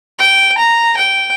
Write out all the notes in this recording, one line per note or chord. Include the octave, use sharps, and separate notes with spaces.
G5
A#5
G5